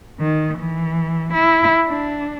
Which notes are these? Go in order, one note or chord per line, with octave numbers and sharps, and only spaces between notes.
D#3
E3
E4
D4